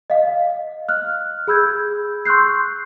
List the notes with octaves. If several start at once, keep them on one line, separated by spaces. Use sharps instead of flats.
D#5 F5
F6 F#6
G#4 B5 E6 G6 G#6
C6 C#6 E6 F#6 G6 C7